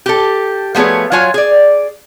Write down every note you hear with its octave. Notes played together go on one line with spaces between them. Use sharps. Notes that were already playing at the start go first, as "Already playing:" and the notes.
G4 A4
F3 A3 B3 G#4 C#5
F#3 F4 C#5 G#5
G#4 D5